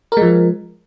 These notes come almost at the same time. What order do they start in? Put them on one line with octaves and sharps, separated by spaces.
A#4 G#3 F3